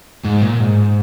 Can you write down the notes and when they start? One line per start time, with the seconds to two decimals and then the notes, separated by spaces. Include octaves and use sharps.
0.25 G#2
0.42 A#2
0.60 G#2